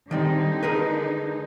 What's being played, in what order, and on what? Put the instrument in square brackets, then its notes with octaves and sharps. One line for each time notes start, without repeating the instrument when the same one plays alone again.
[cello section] D3 G#3 D#4 [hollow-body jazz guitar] D#3 G3 C4
[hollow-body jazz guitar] G#4 A#4 B4